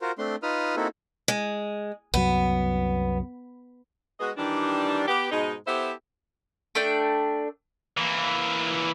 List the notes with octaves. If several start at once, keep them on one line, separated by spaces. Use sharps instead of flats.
F4 F#4 A#4 C5
A3 C4 D4 C6
D#4 F4 B4 D#6 F6
A#3 C4 D#4 E4 F#4 A4
G#3
C2 F#2 F#3 B3
G#3 B3 F#4 G#4 D#5
D#3 E3 G3 D4
B3 G4
G#2 B2 G#3 D#4
B3 E4 G4 A4 C5 E5
A3 D4 G5
E3 A#3